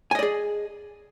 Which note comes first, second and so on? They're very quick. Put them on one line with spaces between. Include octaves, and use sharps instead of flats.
G#5 D#5 D5 G#4